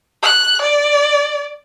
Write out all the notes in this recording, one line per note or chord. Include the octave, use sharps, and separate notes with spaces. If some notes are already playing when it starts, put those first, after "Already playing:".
F#6
D5